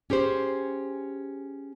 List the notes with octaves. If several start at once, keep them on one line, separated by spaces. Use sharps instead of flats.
C#4 G4 G#4 C5